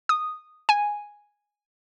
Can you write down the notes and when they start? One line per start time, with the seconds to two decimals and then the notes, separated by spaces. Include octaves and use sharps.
0.09 D#6
0.69 G#5